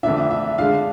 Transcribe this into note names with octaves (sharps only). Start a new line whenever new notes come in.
F2 D3 A3 D4 E5
E5
D3 G#3 D4 F5